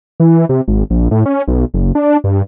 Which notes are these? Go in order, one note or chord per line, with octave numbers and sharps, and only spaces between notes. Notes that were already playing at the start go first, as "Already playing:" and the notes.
E3
C3
G#1
A#1
A2
C#4
B1
F#1
D4
G2